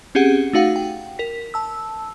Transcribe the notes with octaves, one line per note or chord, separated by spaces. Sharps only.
C4 C#4 G4 G#4 F#5
A3 D#4 F#4 F5 F#5
G5
A#4 B6
A5 E6